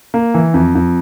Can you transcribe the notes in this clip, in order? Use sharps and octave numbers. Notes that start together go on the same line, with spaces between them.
A#3
E3
F2
F2